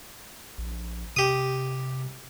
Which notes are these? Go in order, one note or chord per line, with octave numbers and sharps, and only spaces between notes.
A#1
C3 G4 D#6